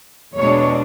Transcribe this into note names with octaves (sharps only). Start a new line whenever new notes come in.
E2 B2 G#3 D4 C#5